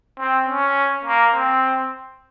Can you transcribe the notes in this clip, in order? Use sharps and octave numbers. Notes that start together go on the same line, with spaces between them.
C4
C#4
A#3
C4